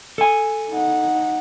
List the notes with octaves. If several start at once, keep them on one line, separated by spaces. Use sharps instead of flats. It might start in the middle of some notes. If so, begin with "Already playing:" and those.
A4 G#5
D#4 F#5